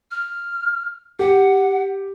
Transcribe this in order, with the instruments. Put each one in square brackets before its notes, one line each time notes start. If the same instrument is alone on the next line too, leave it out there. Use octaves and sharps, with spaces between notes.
[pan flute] F6
[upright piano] G4 [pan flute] F#5